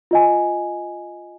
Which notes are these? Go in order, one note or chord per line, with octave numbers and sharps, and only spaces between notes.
F4 D#5 G#5